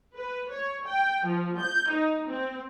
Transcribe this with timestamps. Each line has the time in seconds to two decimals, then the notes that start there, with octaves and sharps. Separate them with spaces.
0.15 B4
0.51 C#5
0.86 G5
1.27 F3
1.59 G6
1.90 D#4
2.28 C4